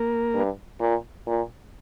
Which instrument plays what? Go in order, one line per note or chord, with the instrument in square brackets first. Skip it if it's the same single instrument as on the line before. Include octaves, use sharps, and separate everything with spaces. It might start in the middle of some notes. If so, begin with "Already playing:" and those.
Already playing: [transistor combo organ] A#3 A#4
[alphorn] G2
A#2
A#2